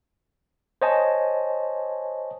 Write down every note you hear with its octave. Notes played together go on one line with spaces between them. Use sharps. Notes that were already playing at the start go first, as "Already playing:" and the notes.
C5 C#5 D#5 G#5 A5